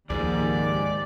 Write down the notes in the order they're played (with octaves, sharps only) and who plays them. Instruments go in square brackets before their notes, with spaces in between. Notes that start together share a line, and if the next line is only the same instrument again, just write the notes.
[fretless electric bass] C#2 F3 G#3 [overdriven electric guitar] G#2 [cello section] D#3 A#3 G4 [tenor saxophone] D5